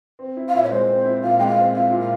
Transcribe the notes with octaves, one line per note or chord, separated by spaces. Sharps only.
C4
E4
F5
A#2 E5
C#5
G#3 C5
C4
E4
A#2 F5
G#3 G5
F5
C4
E4 F5
A#2
F5